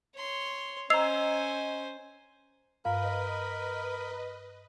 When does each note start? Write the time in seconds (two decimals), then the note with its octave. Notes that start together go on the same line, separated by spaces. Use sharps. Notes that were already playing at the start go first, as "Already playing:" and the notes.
0.17 C#5 C6
0.90 C#4 C5 D#5 G#5 A#5 E6 C7 F7
2.85 G2 A#4 B4 D#5 F5 B5